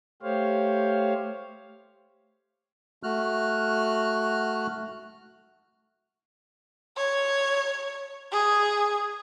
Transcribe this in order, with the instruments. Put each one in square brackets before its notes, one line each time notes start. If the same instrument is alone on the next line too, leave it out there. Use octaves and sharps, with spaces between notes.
[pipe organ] A3 G4 C5 C#5 F5
[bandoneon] A3 F#4 F6 F#6
[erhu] C#5
G#4